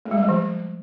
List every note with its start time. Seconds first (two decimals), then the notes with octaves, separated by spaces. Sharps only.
0.06 A3
0.11 G#3
0.17 G3
0.23 A3
0.29 F3